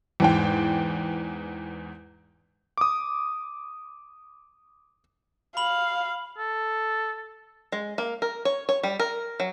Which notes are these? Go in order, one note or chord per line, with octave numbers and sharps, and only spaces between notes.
E2 G#2 G5
D6 D#6
F5 B5 F#7
A4
G#3
A#3
A#4
C#5
C#5
G3
A#4
F#3